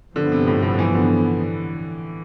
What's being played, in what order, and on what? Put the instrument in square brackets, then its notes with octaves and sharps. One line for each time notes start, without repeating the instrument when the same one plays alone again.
[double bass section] G2 F3 B3 [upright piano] D3
[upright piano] C3
A2
A2
E3
D3